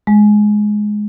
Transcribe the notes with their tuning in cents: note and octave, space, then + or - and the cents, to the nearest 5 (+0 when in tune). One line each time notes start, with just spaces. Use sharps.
G#3 +10